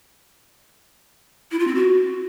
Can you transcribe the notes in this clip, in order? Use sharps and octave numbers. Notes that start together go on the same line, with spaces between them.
E4
F4
C4
F#4